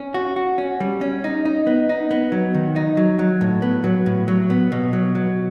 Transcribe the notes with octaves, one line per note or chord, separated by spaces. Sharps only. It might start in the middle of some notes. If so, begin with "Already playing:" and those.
Already playing: C#4
F#4
F#4
C#4
G3
C#4
D#4
D#4
B3
D#4
B3
F#3
D#3
D#4
F#3
F#3
A2
B3
F#3
A2
F#3
B3
B2
F#3
F#3